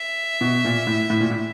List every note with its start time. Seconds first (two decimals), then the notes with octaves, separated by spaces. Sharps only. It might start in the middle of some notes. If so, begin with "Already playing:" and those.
Already playing: E5
0.41 B2
0.65 A#2
0.87 A2
1.10 A2
1.21 A#2
1.31 A2